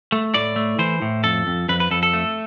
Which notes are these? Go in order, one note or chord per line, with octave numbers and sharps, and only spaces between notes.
A3
A2 D5
A3
E3 C5
A2
F2 A4
F2
F2 B4
B4
F2 A4
A4
A3